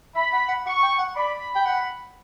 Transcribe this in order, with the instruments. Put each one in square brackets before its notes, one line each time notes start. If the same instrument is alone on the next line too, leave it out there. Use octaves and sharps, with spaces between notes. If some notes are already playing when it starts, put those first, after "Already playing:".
[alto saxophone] E5 [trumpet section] B5
[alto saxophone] F#5
F#5
[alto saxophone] F#5 [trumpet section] C#6
[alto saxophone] G5
F#5
[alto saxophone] D5 [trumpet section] B5
[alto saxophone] G5
F#5